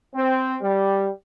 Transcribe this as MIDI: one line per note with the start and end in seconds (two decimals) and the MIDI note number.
0.14 0.55 60
0.61 1.07 55